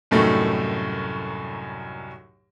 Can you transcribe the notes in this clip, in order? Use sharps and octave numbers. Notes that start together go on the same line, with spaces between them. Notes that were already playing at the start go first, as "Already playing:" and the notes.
C2 F#2 A2 D#3 A3